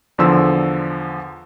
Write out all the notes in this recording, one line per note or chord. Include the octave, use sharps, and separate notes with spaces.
E2 D3 F3 C6 E6